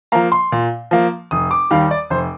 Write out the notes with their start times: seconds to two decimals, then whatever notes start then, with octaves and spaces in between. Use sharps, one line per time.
0.12 F3 A#3 A#5
0.32 C6
0.52 A#2
0.91 F3 A#3
1.31 F1 D#6
1.51 D6
1.71 D#2 D#3 G3 F5
1.91 D5
2.10 F1 C5